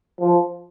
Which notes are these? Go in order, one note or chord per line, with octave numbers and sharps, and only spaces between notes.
F3